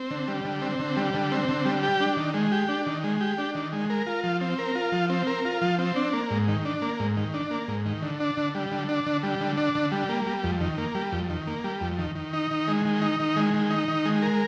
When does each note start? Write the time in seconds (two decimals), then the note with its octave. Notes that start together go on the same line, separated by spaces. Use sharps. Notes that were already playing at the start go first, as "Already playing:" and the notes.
Already playing: C4
0.11 D3
0.28 G3
0.45 D3
0.62 C4
0.79 D3
0.97 G3
1.14 D3
1.32 C4
1.49 D3
1.65 G3
1.83 G4
2.00 D4
2.17 D#3
2.34 G#3
2.52 G4
2.69 D4
2.86 D#3
3.04 G#3
3.21 G4
3.38 D4
3.55 D#3
3.73 G#3
3.90 A#4
4.07 F4
4.24 F3
4.41 C4
4.59 A#4
4.75 F4
4.92 F3
5.10 C4
5.27 A#4
5.45 F4
5.62 F3
5.79 C4
5.96 D4
6.13 A#3
6.31 G#2
6.48 D#3
6.65 D4
6.82 A#3
7.00 G#2
7.17 D#3
7.34 D4
7.51 A#3
7.68 G#2
7.86 D#3
8.02 D3
8.20 D4
8.37 D3
8.55 G3
8.72 D3
8.89 D4
9.06 D3
9.23 G3
9.41 D3
9.57 D4
9.75 D3
9.92 G3
10.09 A#3
10.26 G3
10.44 F2
10.61 D#3
10.78 A#3
10.95 G3
11.12 F2
11.30 D#3
11.47 A#3
11.64 G3
11.81 F2
11.99 D#3
12.15 D#3
12.33 D#4
12.51 D#3
12.68 G#3
12.85 D#3
13.02 D#4
13.20 D#3
13.36 G#3
13.54 D#3
13.70 D#4
13.88 D#3
14.05 G#3
14.22 A#4